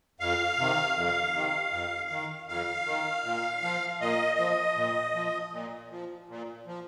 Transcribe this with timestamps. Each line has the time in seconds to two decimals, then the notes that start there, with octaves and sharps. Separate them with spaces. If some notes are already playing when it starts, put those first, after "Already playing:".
0.20 F2 F5
0.59 C3 D#3
0.96 F2
1.35 C3 D#3
1.72 F2
2.11 D#3
2.48 F2 F5
2.87 D#3
3.25 A#2
3.63 F3
4.01 A#2 D#5
4.39 F3
4.77 A#2
5.15 F3
5.53 A#2
5.91 F3
6.29 A#2
6.67 F3